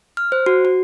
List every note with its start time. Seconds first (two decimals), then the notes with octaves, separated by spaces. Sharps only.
0.17 F6
0.32 C5
0.46 F#4
0.65 F#4